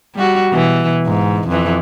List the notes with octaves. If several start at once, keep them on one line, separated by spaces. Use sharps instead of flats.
G3 F#4
B2 E3
G#2
F2 E3